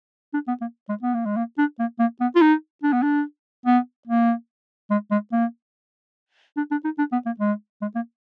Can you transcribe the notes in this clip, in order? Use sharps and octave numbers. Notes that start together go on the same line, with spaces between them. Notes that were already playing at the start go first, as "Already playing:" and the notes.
D4
B3
A#3
G#3
B3
A#3
G#3
A#3
D4
A#3
A#3
B3
F4
D#4
D4
B3
D4
B3
A#3
G#3
G#3
A#3
D4
D4
D#4
D4
B3
A#3
G#3
G#3
A#3